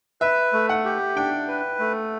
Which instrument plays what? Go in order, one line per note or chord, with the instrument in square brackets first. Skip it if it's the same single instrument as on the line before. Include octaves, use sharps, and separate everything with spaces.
[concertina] B4 [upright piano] E5
[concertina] A3
[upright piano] F#5
[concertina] G4
[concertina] D4 [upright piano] G5
[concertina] B4
A3